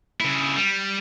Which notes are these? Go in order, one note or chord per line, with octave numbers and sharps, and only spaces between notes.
C#3 E4
G3